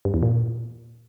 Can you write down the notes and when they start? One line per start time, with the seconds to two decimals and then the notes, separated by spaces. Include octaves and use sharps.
0.05 G2
0.14 E2
0.23 A#2